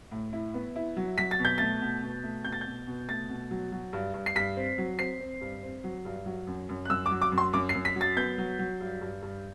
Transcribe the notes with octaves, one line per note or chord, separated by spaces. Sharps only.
A2
E4
B3
E4
F#3
F#3 B6
A6
B2
G6
A3 A6
B2
B2
A3
B2 G6
A6
B2 G6
B2
A3 A6
B2
F#3
F#3
G2
G2
C7
G2 B6
C4
F#3
C4 C7
C4
G2
C4
F#3
G2
F#3
F#2
F#2
F#6
F#2 E6
D6
F#3
D6
F#2
C6
F#2 D6
C7
F#2
B6
F#3
A6
B3 G6
F#3
F#3
G2
G2
G2